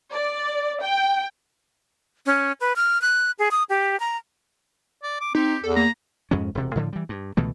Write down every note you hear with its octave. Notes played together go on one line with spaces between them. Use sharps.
D5
G5
C#4
B4
F6
F#6
G#4
D#6
G4
A#5
D5
D6
C4 D#4 G4
E2 A4
A#3 A#5
F2 G#2 G#3 C#4
E1 C3
A2 D3 F3
E3 G3
G2
C#2 B2 E3 A3